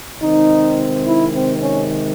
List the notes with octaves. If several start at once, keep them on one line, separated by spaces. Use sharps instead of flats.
C3 D#3 G#3 C4 D#4
E4
C4
C#4